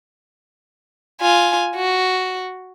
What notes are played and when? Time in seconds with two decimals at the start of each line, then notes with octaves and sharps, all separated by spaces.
1.21 F4 G#5
1.76 F#4